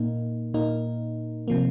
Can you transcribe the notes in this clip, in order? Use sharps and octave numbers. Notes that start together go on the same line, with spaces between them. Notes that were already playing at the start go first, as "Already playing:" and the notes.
Already playing: A#2 A#3 D#4
A#2 A#3 D#4
C3 F3 A#3